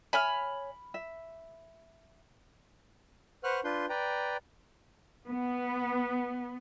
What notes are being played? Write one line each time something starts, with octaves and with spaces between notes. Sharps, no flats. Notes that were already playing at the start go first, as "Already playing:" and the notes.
C#5 E5 G#5 B5 F6
E5
B4 C5 F#5 C#6 F6 F#6
D4 F4 B4 C6 G6
B4 D5 G5 A#5
B3